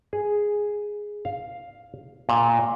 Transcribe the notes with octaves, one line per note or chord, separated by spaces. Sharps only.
G#4
F5
A#2